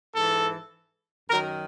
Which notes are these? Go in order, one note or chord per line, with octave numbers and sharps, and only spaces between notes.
G#2 E3 A4
F#2 D#3 F#3 A#4